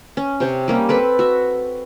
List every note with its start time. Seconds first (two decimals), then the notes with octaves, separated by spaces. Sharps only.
0.17 C#4
0.40 C3 C5 C#5
0.68 G3 A#3 C#4
0.89 C4 A4 B4
1.19 F#4 E5